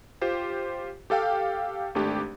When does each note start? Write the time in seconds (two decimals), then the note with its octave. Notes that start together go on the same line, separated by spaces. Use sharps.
0.21 F4 G4 C5
1.10 G4 A4 F5 G5
1.95 G#1 A3 D4 G4